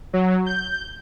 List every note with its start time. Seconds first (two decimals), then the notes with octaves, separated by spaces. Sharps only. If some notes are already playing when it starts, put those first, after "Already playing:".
0.13 F#3
0.46 G6